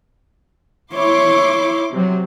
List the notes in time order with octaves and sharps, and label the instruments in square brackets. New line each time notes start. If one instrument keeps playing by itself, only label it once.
[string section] E4 C6 D6 [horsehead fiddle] C#5
[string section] C3 F#3